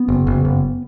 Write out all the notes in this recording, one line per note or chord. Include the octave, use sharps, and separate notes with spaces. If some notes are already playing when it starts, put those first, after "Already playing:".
Already playing: B3
F#1
F#1
F#1